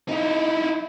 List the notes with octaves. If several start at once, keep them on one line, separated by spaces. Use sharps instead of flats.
D#4 E4